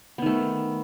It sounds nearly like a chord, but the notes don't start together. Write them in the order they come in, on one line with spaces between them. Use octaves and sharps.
B3 D#3 A3